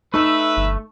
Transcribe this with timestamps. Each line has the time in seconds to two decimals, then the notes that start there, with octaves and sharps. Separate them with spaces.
0.14 A3 D#4 B4 E5
0.57 G1